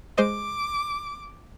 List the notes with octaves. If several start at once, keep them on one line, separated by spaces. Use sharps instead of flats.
G#3 C5 D#5 D6